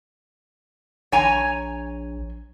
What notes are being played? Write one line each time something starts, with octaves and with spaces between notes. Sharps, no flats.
A#1 C#5 G#5 A#5